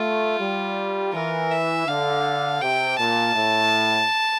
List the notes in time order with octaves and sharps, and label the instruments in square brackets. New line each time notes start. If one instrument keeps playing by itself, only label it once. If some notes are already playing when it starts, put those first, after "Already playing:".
Already playing: [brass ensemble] A3 [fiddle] F4
[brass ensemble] G3
[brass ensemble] E3 [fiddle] A#4
[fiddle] E5
[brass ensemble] D3 [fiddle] F5
[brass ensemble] C3 [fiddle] G5
[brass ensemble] A#2 [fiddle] A5
[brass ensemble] A2